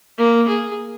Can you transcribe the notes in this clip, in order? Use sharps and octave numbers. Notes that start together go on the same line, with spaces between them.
A#3
G#4